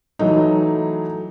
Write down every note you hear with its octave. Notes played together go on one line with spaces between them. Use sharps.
E3 F#3 A3 D#4